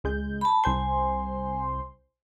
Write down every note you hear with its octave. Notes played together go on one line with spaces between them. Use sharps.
C#2 G#3 G6
A5 B5
C2 C5 G#5 C6